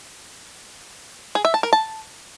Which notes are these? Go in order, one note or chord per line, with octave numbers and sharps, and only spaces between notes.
G#4
E5
A5
A#4
A5